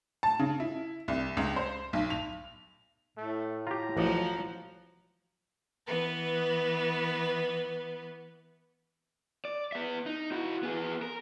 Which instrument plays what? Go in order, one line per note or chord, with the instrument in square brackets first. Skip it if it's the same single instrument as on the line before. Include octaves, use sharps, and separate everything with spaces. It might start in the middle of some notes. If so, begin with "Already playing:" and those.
[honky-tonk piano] A5
C#3
E4
C2
C#2
C5
B1
F7
[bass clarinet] A2 [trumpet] A3
[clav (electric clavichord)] F4 G4 [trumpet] A#5
[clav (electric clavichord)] A1 D5 D#5 [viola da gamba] F3 F#3
[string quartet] E3 B3 B4
[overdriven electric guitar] D5
B3 E5
D#4
E4 F#4
B3 G#4
A#4